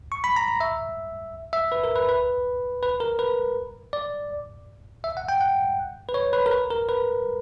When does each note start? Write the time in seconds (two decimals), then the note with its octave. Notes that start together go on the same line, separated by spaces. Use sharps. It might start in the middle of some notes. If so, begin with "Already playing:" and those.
0.12 C#6
0.24 B5
0.36 A#5
0.48 A#5
0.61 E5
1.53 E5
1.72 B4
1.84 A#4
1.96 B4
2.09 B4
2.83 B4
3.00 A#4
3.19 B4
3.93 D5
5.04 E5
5.17 F#5
5.29 G5
5.41 F#5
6.09 B4
6.14 C#5
6.33 B4
6.46 A#4
6.51 B4
6.70 A#4
6.89 B4